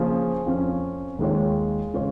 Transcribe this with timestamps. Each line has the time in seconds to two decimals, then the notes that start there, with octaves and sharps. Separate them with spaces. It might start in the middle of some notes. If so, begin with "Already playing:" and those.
Already playing: C#3 F3 A#3 C#4 G#4
0.45 F2 F3 C#4
1.19 D#2 D#3 G#3 F4 C#5
1.94 C#3 G#3 F4 C#5